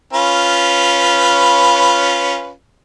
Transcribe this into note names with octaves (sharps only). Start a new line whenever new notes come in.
C#4 F4 B4